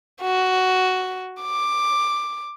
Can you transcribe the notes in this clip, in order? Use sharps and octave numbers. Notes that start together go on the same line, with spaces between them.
F#4
D6